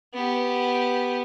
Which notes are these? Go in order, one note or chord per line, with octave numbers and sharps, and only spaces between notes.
B3 G4